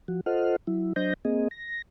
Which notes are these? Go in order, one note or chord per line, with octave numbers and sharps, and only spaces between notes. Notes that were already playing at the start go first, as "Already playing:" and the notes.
F3 F#4
F4 A4 C5 D#5 F#5 F6
F#3 E4
F#3 D4 C5 D#5 G6 A#6
A#3 C4 G#4 D#5
A#6